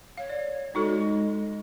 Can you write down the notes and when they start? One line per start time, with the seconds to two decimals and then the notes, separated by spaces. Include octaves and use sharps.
0.18 C#5 F5
0.30 D5
0.75 G#3 D#4 F#4 A4